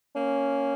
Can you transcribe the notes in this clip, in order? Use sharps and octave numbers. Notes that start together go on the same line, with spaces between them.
A#3 C#4